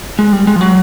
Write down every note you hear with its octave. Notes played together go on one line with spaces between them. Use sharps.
G#3
G3
G#3
F3
F#3